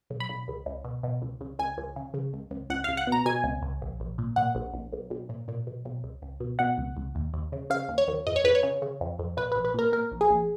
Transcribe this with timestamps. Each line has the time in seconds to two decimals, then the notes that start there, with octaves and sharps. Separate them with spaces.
0.10 B1
0.20 B5
0.29 B1
0.48 C#2
0.66 C#2
0.84 B2
1.03 B2
1.22 C#2
1.41 C#2
1.59 C#2 G#5
1.78 C#2
1.96 C#3
2.14 C#3
2.33 C#2
2.51 C#2
2.70 C#2 F#5
2.84 C#2 F5
2.97 F#5
3.07 B2 A#5
3.26 B2 G#5
3.44 C#2
3.62 C#2
3.82 A#1
4.00 A#1
4.18 A#2
4.36 A#2 F#5
4.55 A#1
4.74 A#1
4.93 B1
5.10 B1
5.29 A#2
5.48 A#2
5.67 B1
5.85 B1
6.03 C#2
6.22 C#2
6.40 B2
6.59 B2 F#5
6.78 C#2
6.97 C#2
7.15 D#2
7.34 D#2
7.52 C#3
7.70 C#3 F5
7.89 D#2
7.98 C#5
8.08 D#2
8.27 F2 D#5
8.36 C#5
8.44 F2 B4
8.55 C#5
8.63 C#3
8.82 C#3
9.01 F2
9.19 F2
9.37 A#1 B4
9.52 B4
9.56 A#1
9.65 B4
9.74 A#2 A#4
9.92 A#2 A#4
10.12 A#1
10.21 G#4
10.30 A#1